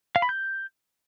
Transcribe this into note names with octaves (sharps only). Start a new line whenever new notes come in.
F5
B5
G6